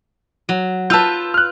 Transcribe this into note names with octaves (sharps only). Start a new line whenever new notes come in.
F#3
F4 B4 A5 E6 G6
F6 F#6